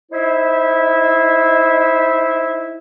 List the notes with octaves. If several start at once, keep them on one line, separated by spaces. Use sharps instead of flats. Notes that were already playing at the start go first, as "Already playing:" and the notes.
D#4 E4 C5 E5